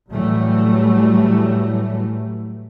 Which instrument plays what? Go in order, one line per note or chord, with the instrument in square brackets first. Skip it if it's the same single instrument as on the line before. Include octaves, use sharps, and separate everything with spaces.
[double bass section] A2 E3 F#3 G3 A3